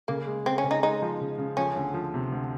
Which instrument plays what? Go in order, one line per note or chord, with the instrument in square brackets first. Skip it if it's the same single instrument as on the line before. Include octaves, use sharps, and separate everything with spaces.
[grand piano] C#3 [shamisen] A#3
[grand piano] G#3
[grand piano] C#3 [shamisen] C4
[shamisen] C#4
[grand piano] C#3
[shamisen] D#4
[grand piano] G#3 [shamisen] D#4
[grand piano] F3
C#3
C#3
[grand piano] F3 [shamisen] C#4
[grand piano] D2
F3
C3
D2